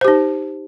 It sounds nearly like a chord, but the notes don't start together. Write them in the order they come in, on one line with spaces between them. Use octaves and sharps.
C5 G4 D#4